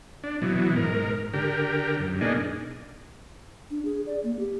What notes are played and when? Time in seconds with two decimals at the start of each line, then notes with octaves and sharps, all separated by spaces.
0.24 D4
0.42 B2 E3 F#3
0.76 G#2 A#4
1.33 D3 G4 A#4
2.00 F#2
2.21 B2 A#3 D4 D#4 G#4
3.71 D4
3.85 G#4
4.06 D5
4.23 A#3
4.39 G4